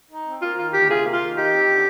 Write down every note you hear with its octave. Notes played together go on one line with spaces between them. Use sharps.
D#4
C4
A#3 F4
D#3 F4
D2 G4
C3 F4 G#4
A#3
F4
D#3
D#4 G4
C4
D3